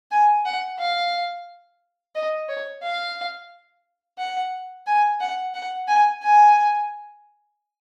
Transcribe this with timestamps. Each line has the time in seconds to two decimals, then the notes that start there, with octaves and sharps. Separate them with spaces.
0.11 G#5
0.45 F#5
0.79 F5
2.15 D#5
2.48 C#5
2.83 F5
4.18 F#5
4.87 G#5
5.20 F#5
5.54 F#5
5.88 G#5
6.23 G#5